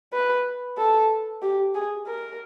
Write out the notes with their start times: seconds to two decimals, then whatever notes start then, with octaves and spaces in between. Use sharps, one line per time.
0.13 B4
0.78 A4
1.42 G4
1.75 G#4
2.07 A#4